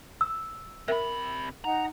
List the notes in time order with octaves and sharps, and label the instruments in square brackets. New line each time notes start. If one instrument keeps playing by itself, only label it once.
[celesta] E6
[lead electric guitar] C3 B5 [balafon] A#4 E5
[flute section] D#4 F#5 [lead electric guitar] A#5